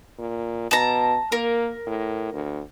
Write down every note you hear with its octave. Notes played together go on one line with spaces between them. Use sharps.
A#2
B2 A5 A#5
A#3 A#4
A2
D2